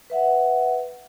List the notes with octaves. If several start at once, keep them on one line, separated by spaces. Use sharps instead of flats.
B4 E5 F#5